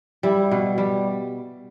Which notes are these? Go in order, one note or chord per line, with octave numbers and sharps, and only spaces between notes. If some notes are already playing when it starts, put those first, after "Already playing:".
G3 E4
B2
G3